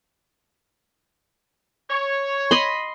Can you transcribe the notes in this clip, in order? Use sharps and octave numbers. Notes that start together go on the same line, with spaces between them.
C#5
D#5 B5 C6